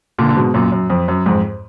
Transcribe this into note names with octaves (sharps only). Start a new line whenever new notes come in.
A#2 D3
D3
G#2 B2
F#2 A#2
F#2
F2
F#2
F2 G#2